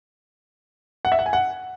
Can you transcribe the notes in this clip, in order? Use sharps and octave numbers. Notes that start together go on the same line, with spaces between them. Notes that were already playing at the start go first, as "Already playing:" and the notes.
F#5
E5
F#5
G#5
F#5